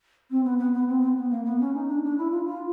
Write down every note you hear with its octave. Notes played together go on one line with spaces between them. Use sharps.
C4
B3
B3
B3
C4
C4
C4
B3
A#3
B3
C#4
D#4
D4
D4
E4
F4
F4